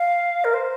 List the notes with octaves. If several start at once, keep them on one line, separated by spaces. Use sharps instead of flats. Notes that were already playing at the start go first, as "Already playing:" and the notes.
Already playing: F5
A#4
C5